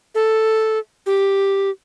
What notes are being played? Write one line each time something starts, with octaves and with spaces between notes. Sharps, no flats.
A4
G4